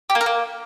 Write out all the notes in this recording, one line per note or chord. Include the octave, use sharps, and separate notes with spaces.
G4
A#3
A#4
A#3